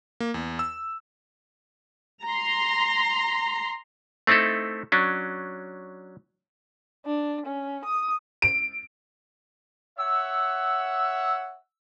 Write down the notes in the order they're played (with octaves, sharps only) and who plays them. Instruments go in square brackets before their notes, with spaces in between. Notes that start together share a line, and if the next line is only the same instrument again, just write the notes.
[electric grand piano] A#3
E2
E6
[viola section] A#5 C6
[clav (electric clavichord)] A3 C4 D#4 E4 A4
F#3 C#4 D4
[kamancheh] D4
C#4
D#6
[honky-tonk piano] D7
[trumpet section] C#5 E5 F#5 [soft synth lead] E6